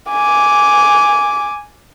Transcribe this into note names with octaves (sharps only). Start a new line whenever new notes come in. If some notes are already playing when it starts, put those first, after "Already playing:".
G#5 D6